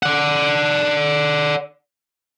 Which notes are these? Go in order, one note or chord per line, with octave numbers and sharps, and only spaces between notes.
D5 F#5